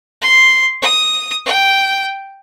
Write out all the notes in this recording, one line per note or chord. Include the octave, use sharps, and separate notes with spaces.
C6
D#6
G5